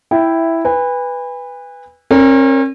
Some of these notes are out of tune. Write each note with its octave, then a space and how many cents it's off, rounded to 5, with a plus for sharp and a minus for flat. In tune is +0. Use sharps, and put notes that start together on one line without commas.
E4 +0 E5 +5 G5 +0
B4 +0 G#5 -40
C#4 -45 A#4 -5 C#5 +45